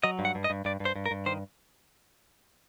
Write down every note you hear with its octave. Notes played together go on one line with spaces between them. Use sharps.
F#3 D#5
G2
F#5
G2
D#5
G2
G2 D5
G2
C5
G2
A#4
G2
D#3 C5